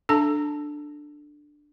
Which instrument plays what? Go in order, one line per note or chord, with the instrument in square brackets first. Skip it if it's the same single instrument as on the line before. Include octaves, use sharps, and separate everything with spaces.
[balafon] D4 A4 A5